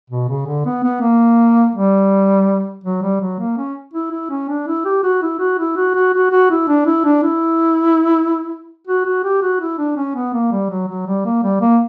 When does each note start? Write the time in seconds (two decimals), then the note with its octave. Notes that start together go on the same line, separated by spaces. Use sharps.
0.10 B2
0.29 C#3
0.47 D3
0.65 B3
0.84 B3
1.01 A#3
1.75 G3
2.84 F#3
3.02 G3
3.21 F#3
3.39 A#3
3.58 C#4
3.93 E4
4.12 E4
4.30 C#4
4.49 D4
4.68 E4
4.85 G4
5.03 F#4
5.22 E4
5.39 F#4
5.58 E4
5.77 F#4
5.95 F#4
6.13 F#4
6.31 F#4
6.50 E4
6.68 D4
6.86 E4
7.05 D4
7.23 E4
8.87 F#4
9.06 F#4
9.24 G4
9.42 F#4
9.61 E4
9.78 D4
9.97 C#4
10.15 B3
10.34 A#3
10.52 G3
10.70 F#3
10.88 F#3
11.06 G3
11.25 A#3
11.43 G3
11.61 A#3